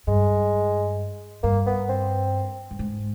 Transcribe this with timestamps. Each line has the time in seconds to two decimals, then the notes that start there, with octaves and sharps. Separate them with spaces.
0.07 G2 G#3
1.43 G2 A#3
1.67 B3
1.89 C4
2.71 G2
2.79 G#2